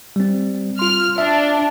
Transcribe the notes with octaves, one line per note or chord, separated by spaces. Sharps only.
G3 C4
F4 C6 F6
D4 E5